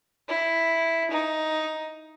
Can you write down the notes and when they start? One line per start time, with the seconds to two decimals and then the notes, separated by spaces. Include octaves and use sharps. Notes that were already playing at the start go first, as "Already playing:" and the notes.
0.29 E4
1.10 D#4